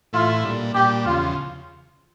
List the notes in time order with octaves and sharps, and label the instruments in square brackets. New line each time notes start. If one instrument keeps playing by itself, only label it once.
[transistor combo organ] A2 E3 A3 E4 [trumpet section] F4
[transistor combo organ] A#2 G3 D4
[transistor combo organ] A#2 G3 D4 [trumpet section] G4
[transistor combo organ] E2 C#3 F3 [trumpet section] F4